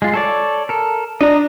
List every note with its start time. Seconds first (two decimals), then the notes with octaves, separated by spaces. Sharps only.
0.02 G#3 F4
0.14 A4 C#5 D5
0.69 A4 A#4
1.21 D4 D#5 A#5